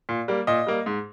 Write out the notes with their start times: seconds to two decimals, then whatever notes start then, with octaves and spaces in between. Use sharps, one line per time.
0.09 A#2
0.28 G3 A#3
0.47 A#2 D#5
0.67 G3 A#3
0.86 G#2